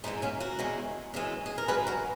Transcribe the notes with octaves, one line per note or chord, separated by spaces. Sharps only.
G#2 E3 G#3 B3 D#4
A#3 C#4
F#4 A#4
E2 C#3 E3 G#3
F#2 C#3 E3 G#3
G#4
A#4
F#2 C#3 G#3 G#4 B4
F#4 A#4